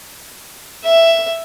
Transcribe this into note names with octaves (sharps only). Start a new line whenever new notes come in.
E5